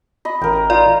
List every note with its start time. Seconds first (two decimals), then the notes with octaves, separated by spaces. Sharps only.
0.25 D#5 B5
0.41 A1 A#4 G5
0.70 D#4 F4 D5